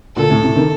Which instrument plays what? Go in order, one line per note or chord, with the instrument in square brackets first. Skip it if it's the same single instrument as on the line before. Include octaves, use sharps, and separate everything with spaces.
[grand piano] A#2 D3 [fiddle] A4
[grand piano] A2 C3
A2 C3
C3 D#3